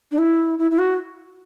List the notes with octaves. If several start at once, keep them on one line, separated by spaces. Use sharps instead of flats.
D4
E4
E4
E4
F#4